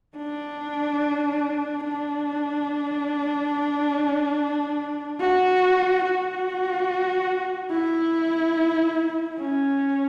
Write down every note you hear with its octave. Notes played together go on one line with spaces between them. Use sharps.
D4
D4
F#4
F#4
E4
C#4